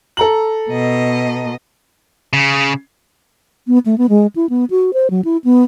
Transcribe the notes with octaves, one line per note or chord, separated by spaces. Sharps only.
A4 A#5 F#7
B2 D#5
C#3
B3
A3
B3
G#3
E4
B3
F#4
C5
F#3
E4
B3